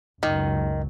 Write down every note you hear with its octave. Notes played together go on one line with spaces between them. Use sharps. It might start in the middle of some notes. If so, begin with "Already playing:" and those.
F#1 C#2 D#3 F#3